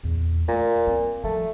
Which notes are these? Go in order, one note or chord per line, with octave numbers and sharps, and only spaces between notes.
E2 A#2
A#2 A3
G3 C4
F3 G3 A3